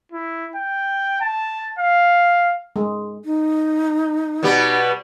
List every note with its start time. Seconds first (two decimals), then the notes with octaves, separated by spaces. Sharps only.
0.12 E4
0.56 G5
1.21 A5
1.79 F5
2.76 G#3
3.24 D#4
4.43 B2 G3 B3